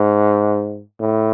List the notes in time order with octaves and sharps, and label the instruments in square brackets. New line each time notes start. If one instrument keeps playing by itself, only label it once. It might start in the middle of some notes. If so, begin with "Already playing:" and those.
Already playing: [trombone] G#2
A2